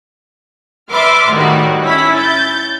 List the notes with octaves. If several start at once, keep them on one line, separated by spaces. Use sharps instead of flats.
B4 D5 E5 C6 D6 F6
A2 D#3 G3 D#4 F#4
C#4 E4 B5 B6
G6 A6